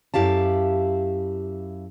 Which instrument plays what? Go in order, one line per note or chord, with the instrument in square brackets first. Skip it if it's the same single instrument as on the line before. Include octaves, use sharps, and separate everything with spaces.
[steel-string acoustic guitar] F#2 E4 G4 F5 A5